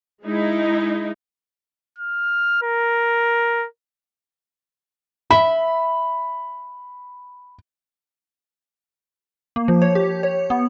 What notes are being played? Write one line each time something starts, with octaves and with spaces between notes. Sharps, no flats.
G#3 D#4 E4
F6
A#4
E5 B5
A#3
F3
C#5
G4
C#5
B3